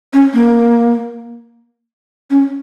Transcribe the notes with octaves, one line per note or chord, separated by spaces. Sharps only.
C#4
A#3
C#4